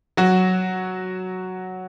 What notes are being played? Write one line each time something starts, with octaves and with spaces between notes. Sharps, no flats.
F#3 F#4